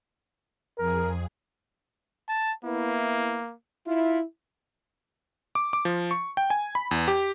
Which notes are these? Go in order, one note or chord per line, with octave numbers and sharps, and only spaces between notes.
F2 G#4 A#4
A5
A#3 B3 E4
E4 F4
D6
D6
F3
C#6
G5
G#5
B5
E2
G4